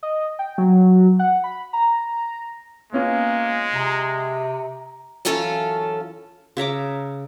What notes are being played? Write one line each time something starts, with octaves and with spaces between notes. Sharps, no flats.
D#5
G5
F#3
F#5
B5
A#5
G#3 A#3 B3 C#4 F4
C3 A#5
F#2 E3 C#4 F4 A4 F5
C#3 E5 A#5 D6